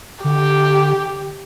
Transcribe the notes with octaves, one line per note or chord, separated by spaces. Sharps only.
D3 G4